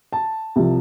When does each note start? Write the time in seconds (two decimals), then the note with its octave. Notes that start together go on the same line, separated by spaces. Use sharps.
0.13 A5
0.56 C2 C3 F3